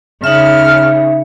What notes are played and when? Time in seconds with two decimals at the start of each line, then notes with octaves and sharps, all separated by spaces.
0.24 C#3 D#4 E5 F6